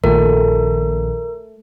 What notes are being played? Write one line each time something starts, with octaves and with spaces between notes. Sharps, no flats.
A#1 A#2 D#3 A3 A#4